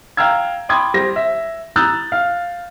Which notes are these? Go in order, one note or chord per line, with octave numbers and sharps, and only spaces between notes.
F5 G5 A#5 E6 G#6
G5 B5 C6 D6 D#6 G#6
G3 C5 A#6
E5
A#5 D#6 E6 F#6 G6 A6
F5